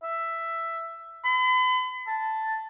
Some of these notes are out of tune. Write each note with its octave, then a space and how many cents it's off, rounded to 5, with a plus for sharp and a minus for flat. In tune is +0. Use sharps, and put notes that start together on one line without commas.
E5 +5
B5 +40
A5 +0